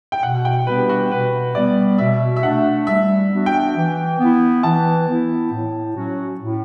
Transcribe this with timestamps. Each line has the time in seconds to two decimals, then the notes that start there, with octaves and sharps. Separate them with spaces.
0.12 G5
0.23 B2 F#5
0.45 G5
0.67 G3 B3 D4 G4 B4
0.89 F#4
1.11 B2 B4
1.55 G3 B3 D5
1.98 B2 E5
2.36 E5
2.43 A3 D4 F#5
2.87 G3 E5
3.32 B3 D4 F#4
3.46 G5
3.75 E3
4.19 B3 E4
4.63 E3 A5
5.07 B3 E4
5.51 A2
5.95 F#3 C#4 F#4
6.40 A2